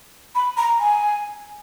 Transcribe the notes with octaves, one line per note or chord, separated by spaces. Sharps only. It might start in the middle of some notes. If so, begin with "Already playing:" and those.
B5
A#5
G#5